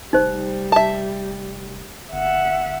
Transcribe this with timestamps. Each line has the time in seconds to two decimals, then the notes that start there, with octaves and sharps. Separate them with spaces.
0.13 F1 G3 D#4 C5
0.72 E5 A5
2.12 G1 E5 F#5